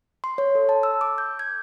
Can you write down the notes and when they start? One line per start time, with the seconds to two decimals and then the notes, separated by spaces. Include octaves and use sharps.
0.24 C6
0.38 C#5
0.55 A4
0.69 A5
0.83 E6
1.01 D6
1.18 G6
1.39 G#6